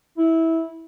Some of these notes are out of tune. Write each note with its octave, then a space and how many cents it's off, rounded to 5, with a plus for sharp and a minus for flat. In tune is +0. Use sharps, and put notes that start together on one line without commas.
E4 -15